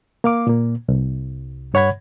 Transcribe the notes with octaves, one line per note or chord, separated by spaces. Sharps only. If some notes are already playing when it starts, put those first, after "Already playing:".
A#3 F5 D6
A#2 A#3
C2
G2 C#5 F#5 B5 G#6